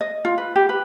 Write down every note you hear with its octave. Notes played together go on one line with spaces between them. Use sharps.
D#5
F4
B4
G4
B4